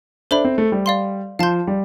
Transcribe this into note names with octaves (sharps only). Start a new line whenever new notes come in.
D4 A4 C5 E5 B5
C4
A3
G3
D5 F5 C6
F3 F5 A5 C6 G6
G3